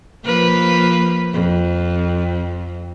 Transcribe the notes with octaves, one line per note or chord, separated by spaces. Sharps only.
F3 A#3 B4
F2